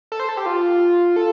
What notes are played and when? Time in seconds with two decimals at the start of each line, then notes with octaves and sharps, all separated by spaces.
0.12 A4
0.20 C5
0.29 A4
0.37 G4
0.46 F4
1.16 A4